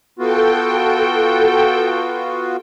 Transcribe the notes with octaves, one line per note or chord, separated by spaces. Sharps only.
B3 F4 F#4 A4 G5